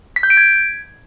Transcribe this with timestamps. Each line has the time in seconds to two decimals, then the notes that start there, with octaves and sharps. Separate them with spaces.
0.16 B6
0.23 G6
0.30 D7
0.37 G#6